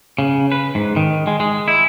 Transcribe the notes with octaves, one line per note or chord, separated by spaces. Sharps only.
C#3
B4
G#2
D#3
G#3
G#3
E4